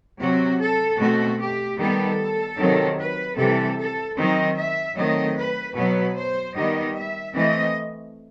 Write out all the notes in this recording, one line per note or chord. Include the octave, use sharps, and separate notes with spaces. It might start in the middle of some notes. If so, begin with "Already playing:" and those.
C3 F#3 C4 F#4
A4
B2 A3 C4 F#4
G4
D#3 G3 B3 A4
C3 D#3 F#3 C4
B4
C3 E3 G3 C4 A4
A4
D#3 F#3 C4 D#5
E5
D#3 F#3 A3 C4 D#5
B4
B2 F#3 B3 B4
C5
D#3 G3 B3 D#5
E5
E3 A3 C4 D#5